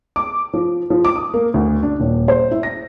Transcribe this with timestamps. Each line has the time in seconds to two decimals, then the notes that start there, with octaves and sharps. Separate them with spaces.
0.16 D6
0.54 F3
0.90 F3
1.05 D6
1.16 D#6
1.34 A#3
1.54 D2
1.83 D4
2.00 D#1
2.28 C5
2.51 E4
2.63 A#6